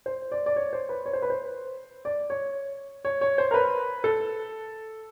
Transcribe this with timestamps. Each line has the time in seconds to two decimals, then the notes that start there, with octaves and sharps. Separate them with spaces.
0.06 C5
0.32 D5
0.46 D5
0.56 C#5
0.73 C5
0.89 B4
1.06 C#5
1.13 C5
1.22 B4
1.30 C5
2.05 D5
2.30 C#5
3.05 C#5
3.21 C#5
3.38 C5
3.51 A#4
3.54 B4
4.04 A4